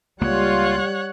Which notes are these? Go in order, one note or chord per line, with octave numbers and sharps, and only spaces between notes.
C#2 G3 A#3 F4 C#5 F#5